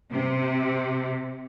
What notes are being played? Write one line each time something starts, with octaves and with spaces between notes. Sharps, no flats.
C3